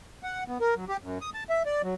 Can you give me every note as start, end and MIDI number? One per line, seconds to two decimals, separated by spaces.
0.23 0.44 78
0.48 0.58 59
0.61 0.74 70
0.76 0.85 54
0.88 0.97 67
1.03 1.18 42
1.21 1.30 87
1.34 1.44 81
1.50 1.63 76
1.66 1.82 74
1.83 1.94 54